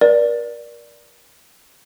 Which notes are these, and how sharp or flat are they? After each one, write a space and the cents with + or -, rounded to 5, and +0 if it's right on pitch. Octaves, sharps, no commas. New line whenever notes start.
A#4 +40 D5 +0